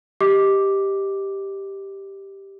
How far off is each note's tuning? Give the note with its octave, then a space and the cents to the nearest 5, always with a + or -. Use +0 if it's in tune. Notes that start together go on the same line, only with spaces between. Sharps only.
G4 +0 D#5 +10 D6 +0